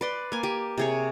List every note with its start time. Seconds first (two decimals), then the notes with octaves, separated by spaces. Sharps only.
0.01 B4 D5 C6
0.32 A#3 G#5
0.43 G4 G#5
0.78 C3 G#4 C#5